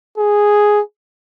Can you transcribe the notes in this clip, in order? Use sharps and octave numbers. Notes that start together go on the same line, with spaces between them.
G#4